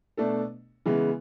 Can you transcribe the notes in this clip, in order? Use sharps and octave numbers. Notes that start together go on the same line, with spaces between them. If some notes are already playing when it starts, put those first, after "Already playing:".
B2 A3 D4 A4
C#3 E3 G#3 B3